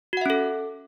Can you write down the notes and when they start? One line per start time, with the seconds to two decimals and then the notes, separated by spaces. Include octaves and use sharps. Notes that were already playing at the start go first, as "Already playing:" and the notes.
0.13 F#4
0.17 F#5
0.21 E5
0.26 C#4
0.30 A4